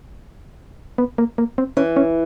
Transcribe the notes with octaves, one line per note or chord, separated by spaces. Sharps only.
B3
A#3
A#3
C4
E3 C#4
C#4